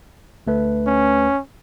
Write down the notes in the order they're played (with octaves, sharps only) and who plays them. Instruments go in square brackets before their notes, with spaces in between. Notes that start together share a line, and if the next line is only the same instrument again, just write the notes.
[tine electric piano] D2 A3 B4
[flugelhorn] C#4